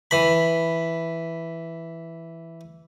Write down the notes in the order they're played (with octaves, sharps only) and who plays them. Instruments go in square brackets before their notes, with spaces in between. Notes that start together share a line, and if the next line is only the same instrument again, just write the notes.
[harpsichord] E3 B5